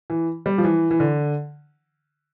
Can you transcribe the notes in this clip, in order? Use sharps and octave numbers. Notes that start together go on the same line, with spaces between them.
E3
G3
F3
E3
E3
D3